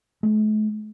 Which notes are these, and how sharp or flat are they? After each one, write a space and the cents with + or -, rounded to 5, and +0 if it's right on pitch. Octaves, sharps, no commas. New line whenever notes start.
A3 -45